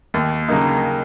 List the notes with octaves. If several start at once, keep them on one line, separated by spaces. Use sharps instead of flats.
D#2
C#3 F#3 A#3 D#4